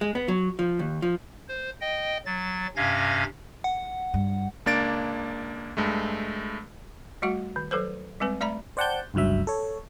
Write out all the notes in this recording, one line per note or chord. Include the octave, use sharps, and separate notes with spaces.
G#3
B3
F#3
F3
D#2
F3
C5
D#5 G5
F#3 A6
G2 C3 C#4 F5 G#6 A#6
F#5
G2
C#2 A#3 D4 A6 D7
G2 G#3 A3
G3 A3 F#4 F#5
D#3
F#3 A4 B4 C5
G3 G#3 C4 B4
A3 D5 E5 A#5 B5
C5 D5 F#5 G5 A5 G6
G1 C#2 G2 F#3 E5
A4 C#5